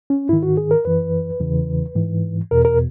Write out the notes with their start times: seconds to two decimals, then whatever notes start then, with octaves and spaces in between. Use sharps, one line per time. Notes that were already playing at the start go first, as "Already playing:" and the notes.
0.10 C#4
0.29 G#2 D#3 E4
0.43 F#4
0.57 G#4
0.71 A#4
0.85 F#2 E3 B4
1.40 E2 C#3 E3
1.95 G#2 E3
2.51 E2 B2 A#4
2.65 A#4